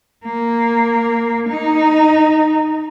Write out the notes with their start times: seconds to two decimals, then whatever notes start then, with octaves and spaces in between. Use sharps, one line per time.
0.25 A#3
1.49 D#4